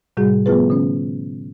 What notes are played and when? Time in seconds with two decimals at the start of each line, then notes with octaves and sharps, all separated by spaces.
0.17 A2 C3 G3 F#4 G#4
0.46 F3 A3 B3 F4 G#4 B4
0.70 D3 C#4